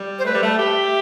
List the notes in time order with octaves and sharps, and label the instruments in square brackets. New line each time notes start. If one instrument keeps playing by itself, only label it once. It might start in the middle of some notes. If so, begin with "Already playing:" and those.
Already playing: [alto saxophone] G3
[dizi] C5
[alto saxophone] A3 [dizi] B4
[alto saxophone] G3
[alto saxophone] A3 [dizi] A5
[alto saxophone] G4 [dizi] E5